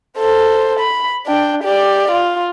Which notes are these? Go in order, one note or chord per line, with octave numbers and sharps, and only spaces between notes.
A4 C5
B5
D4 G5
G4 D5
F4